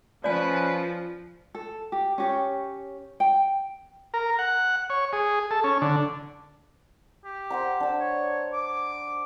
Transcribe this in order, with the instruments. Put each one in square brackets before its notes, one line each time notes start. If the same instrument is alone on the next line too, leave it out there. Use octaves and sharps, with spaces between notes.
[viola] F3 [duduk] C#4 [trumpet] B4 [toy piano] D5 G#5
[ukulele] A4
G4
C#4 G4 C#5
G5
[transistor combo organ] A#4
F#5
C#5
G#4
A4
C#4
D3
[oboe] G4
[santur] C5 F#5 A#5
D4 E6
[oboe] C#5
D6